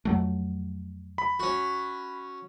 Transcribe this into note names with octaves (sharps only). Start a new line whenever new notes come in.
F2 F#3 A3
B5
C#4 F#4